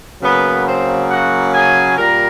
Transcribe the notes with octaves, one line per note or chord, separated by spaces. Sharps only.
C#3 F#3 A#3 B3 B4
C4 C5
F#4 F#5
G#4 G#5
A#2 G3 A#4 A#5